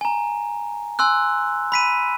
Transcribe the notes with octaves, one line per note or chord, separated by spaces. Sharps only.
G#5 A#5
G#5 C6 E6 F#6
B5 B6 D#7